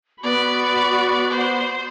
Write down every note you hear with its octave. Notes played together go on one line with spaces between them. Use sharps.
B3 F#4 D5 B5
C5